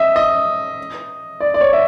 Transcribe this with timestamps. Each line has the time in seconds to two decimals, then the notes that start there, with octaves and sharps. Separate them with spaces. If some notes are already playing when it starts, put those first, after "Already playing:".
Already playing: D#5 E5
0.16 D#5
1.40 D5
1.54 D5
1.61 C#5
1.73 E5